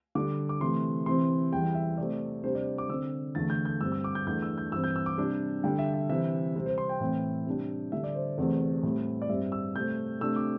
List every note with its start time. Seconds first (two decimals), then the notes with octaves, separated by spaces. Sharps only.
0.15 D3 G3 D4 D6
0.49 D6
0.60 C3 E3 A3 C6
1.06 C3 E3 C4 C6
1.52 E2 E3 G3 G5
1.75 E5
1.97 C3 A3 C4 D5
2.43 C3 G3 D4 C5
2.55 D5
2.78 D6
2.89 D3 C4 E6
3.35 E2 D3 A3 A6
3.50 G6
3.65 G6
3.81 G2 G3 C4 E6
3.92 E6
4.04 D6
4.15 G6
4.26 E2 E3 A3 D4 G6
4.42 E6
4.58 G6
4.72 G2 E3 G3 C4 E6
4.84 G6
4.96 E6
5.06 D6
5.18 C3 G3 D4
5.64 D3 G3 D4 G5
5.79 E5
5.94 E5
6.09 C3 E3 C4 E5
6.56 C3 G3 C4
6.66 C5
6.78 C6
6.89 G5
7.00 A2 E3 C4
7.46 C3 G3 D4
7.92 D3 G3 D4 E5
8.04 D5
8.15 C5
8.37 E2 C3 A3 C4
8.83 A2 G3 C4
9.22 D5
9.29 G2 G3 C4 E5
9.52 E6
9.75 C3 A3 C4 G6
10.21 C3 A3 D4 E6
10.36 D6